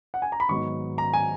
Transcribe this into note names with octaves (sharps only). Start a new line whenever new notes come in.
F#5
G#5
A#5
B5
G#1 G#2 F#3 B3 D#4 C#6
A#5
G#5